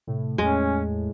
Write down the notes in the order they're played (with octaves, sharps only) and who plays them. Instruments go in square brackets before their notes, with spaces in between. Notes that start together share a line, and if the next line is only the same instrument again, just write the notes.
[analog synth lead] A2 [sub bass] C3
[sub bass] E2 [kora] G#3 [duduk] C#4